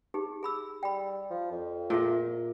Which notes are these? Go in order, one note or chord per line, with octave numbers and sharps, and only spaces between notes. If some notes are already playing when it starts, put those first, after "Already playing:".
D#4 G4 G#4
G#4 B5 E6
G3 G5 B5
F3
F2
A#2 E4 G#4 E5